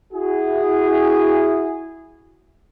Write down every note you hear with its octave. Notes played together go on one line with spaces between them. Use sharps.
E4 F#4 G#4